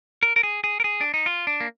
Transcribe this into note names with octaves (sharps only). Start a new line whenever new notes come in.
A#4
A#4
G#4
G#4
A#4
G#4
D4
D#4
F4
D4
A#3